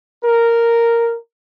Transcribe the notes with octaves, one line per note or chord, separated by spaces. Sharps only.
A#4